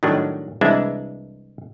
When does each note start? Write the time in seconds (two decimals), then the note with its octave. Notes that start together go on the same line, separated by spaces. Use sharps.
0.03 A2 D#3 F#3 G3 D4
0.61 C2 E3 G#3 D4 E5